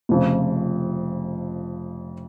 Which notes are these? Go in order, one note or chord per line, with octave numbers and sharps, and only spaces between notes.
F1 F2 C#3